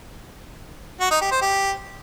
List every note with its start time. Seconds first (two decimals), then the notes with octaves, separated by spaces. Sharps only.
1.01 F#4
1.11 D#4
1.21 G4
1.31 C5
1.42 G4